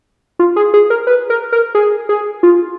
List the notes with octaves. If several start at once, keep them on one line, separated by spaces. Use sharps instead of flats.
F4
G#4
G#4
A#4
B4
A#4
A#4
G#4
G#4
F4